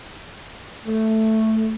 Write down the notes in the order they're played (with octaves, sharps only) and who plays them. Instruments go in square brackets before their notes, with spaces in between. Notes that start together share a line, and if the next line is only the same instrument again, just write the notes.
[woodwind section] A3